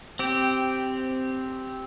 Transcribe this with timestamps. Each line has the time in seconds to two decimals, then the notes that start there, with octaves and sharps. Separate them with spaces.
0.19 C4 G4